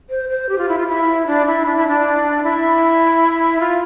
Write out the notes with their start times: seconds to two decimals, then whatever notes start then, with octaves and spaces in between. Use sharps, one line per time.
0.10 C5
0.29 C5
0.49 G4
0.58 F4
0.69 E4
0.78 F4
0.87 E4
1.26 D4
1.46 E4
1.66 D4
1.76 E4
1.87 D4
2.43 E4
3.60 F4